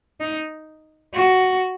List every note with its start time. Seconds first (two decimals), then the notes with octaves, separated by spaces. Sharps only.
0.20 D#4
1.14 F#4